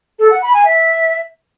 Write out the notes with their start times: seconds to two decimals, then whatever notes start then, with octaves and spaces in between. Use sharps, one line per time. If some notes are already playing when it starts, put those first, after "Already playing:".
0.19 A4
0.31 F#5
0.42 B5
0.54 G#5
0.65 E5